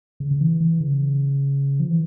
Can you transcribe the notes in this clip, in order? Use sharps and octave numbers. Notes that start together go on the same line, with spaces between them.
C#3
C#3
E3
E3
C#3
F3
E3